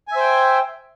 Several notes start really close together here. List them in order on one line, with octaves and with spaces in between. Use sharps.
G#5 E5 C5 G5